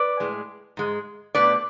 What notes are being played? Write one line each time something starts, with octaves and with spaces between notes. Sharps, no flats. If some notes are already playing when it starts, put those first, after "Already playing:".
Already playing: B4 D5
A2 G#3
G#2 G#3
B2 A3 B4 D5